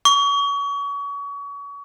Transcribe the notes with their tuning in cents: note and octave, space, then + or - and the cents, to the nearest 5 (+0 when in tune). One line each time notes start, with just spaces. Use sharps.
C#6 +35